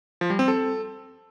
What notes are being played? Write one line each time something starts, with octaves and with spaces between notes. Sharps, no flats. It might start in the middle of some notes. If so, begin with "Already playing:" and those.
F3
G3
C4
A4